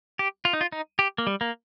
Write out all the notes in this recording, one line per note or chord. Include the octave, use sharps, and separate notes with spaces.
G4
F4
D#4
F4
D#4
G4
A#3
G3
A#3